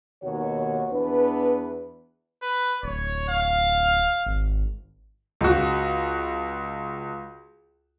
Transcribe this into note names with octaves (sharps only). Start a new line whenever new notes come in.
D#2 B2 D#3 F#4 C#5
E2 B3 D4 B4
B4
D1 C#5
F5
G#1
C#2 F#4